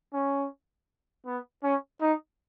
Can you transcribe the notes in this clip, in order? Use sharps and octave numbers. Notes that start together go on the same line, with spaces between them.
C#4
B3
C#4
D#4